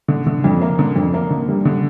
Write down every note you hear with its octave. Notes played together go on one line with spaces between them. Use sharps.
D3
D3
F2
A#3
D3
F2
A#3
D3
G3
D3